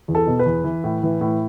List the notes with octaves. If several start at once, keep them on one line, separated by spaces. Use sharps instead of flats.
E2
A4
B2
B4
E2
E3
A2
E3
A2